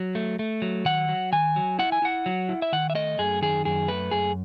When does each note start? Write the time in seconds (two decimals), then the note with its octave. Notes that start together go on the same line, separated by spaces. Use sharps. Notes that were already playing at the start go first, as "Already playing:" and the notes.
Already playing: F#3
0.15 A3
0.39 A3
0.62 F#3
0.85 D#3 F#5
1.09 F#3
1.32 D#3 G#5
1.56 F#3
1.79 E4 F#5
1.92 G#5
2.02 E4 F#5
2.26 F#3
2.49 E4
2.62 E5
2.72 D#3 F#5
2.90 E5
2.95 A3 D#5
3.18 F#2 G#4
3.42 D#3 G#4
3.65 F#2 G#4
3.88 A3 B4
4.11 F#2 G#4